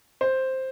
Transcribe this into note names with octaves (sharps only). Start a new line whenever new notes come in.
C5